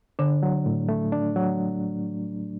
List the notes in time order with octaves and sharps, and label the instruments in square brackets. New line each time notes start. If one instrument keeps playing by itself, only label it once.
[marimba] D3 [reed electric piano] D4
[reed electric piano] F#3
A2
A3
D4
F#3